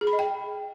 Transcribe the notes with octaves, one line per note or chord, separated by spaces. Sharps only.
G#4
B5
D#5
G5